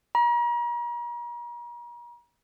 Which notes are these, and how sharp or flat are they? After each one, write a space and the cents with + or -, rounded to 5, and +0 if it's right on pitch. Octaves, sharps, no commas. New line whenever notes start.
A#5 +40